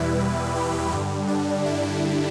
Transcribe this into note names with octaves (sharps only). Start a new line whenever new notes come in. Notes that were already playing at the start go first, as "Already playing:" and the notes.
Already playing: E2 B2 G3 E4 B4
G4
G2 D3 G3
D4
E4